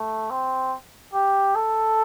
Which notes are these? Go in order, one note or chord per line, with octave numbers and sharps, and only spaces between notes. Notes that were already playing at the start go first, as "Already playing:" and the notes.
Already playing: A3
C4
G4
A4